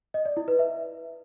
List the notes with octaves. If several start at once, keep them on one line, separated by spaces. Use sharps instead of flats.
D#5
D5
E4
B4
E5